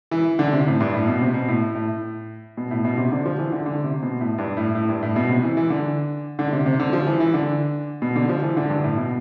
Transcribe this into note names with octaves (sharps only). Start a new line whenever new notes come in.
E3
D3
C3
A2
G2
A2
B2
C3
B2
A2
A2
B2
A2
B2
C3
D3
F3
E3
D3
D3
C3
B2
A2
G2
A2
A2
G2
A2
B2
C3
E3
E3
D3
D3
C3
C3
D3
F3
E3
E3
D3
B2
D3
F3
E3
D3
G2
A2
B2